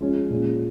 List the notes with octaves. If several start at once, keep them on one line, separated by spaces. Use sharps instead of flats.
F3 G#3 C#4
A#2 G#3 C#4